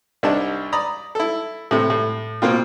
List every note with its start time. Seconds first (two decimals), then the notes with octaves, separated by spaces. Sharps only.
0.23 C2 G3 D4 D#4 A5
0.73 D5 A#5 B5 D#6
1.15 E4 A4
1.71 A2 C3
1.90 A2
2.42 B2 A#3 C4 F4